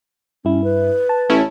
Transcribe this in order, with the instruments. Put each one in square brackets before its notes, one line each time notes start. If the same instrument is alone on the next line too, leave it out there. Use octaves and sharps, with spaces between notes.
[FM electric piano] G2 E4 [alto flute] C#4
[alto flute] B4
[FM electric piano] A5
[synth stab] A1 C#4 E4